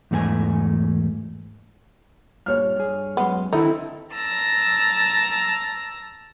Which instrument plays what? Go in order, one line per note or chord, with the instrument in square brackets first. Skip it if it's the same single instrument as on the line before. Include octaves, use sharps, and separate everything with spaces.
[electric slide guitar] E2 G#2 A3 F4 G#5
[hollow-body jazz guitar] G2 A#2 G3 [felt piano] C#5 F6
[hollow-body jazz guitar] G2 G#4
[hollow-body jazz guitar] F#2 G#3 C6 [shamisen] B3
[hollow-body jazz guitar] D3 D#3 [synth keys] C4 E4 A4 [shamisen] D#4 [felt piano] E5
[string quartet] A5 A#5 E6 A#6